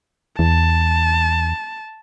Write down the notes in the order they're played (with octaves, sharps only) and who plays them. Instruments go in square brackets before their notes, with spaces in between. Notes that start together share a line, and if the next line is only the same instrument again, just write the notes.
[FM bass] E2 [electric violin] A5